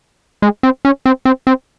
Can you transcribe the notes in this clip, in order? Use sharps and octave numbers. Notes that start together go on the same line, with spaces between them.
G#3
C4
C#4
C4
C4
C4